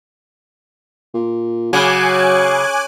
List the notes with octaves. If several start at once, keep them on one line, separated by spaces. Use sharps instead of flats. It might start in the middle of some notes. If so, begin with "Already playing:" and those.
A#2
C#3 F#3 G#5 D6 F#6